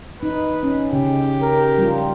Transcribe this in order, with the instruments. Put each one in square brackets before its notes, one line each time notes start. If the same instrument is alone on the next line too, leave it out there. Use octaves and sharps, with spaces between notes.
[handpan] D#4 [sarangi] B4
[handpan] C#4
[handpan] C#3 [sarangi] G4
[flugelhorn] A#4
[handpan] G3 F4